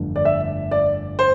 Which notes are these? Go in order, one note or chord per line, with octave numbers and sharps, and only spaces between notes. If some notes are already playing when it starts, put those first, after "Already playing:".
Already playing: G1 F2 D3 A3
D5
E5
D5
C5